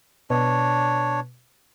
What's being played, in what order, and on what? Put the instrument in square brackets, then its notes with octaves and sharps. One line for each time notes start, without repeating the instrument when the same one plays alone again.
[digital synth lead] B2 [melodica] D4 C#5